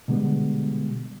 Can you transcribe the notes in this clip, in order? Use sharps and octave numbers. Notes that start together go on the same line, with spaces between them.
B2 D3 G3 G#3 B3